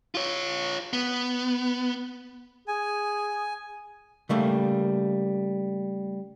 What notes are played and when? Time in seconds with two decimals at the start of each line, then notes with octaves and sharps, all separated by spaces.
0.15 F4 C#5
0.93 B3
2.68 G#4 G#5
4.29 C#3 G3 A3 A#3